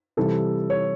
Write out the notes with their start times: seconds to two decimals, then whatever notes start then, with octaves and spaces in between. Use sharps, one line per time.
0.17 C3 E3 G3 A4
0.70 C#5